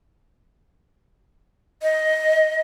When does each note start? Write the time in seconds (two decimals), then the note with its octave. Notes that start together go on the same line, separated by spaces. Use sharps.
1.82 D#5